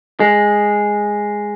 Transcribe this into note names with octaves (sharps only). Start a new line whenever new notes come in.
G#3